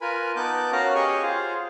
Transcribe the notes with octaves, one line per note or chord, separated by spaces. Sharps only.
F4 A#4 B4 G#5 B5
B3 D#4 A5 D6 F#6 G6
C#4 F#4 A#4 F5 A#5 F#6
G4 G#4 C#5 D#5 G#5 C#6
F4 G#4 C5 F5